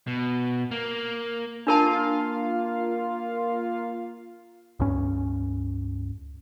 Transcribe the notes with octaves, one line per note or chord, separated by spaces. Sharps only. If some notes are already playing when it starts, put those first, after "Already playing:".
B2
A#3
A#3 D4 F4 A#4 F5 A5
C#2 G2 C#4